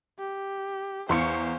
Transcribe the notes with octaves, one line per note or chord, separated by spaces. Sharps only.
G4
E2 C5 F5 C#6 C#7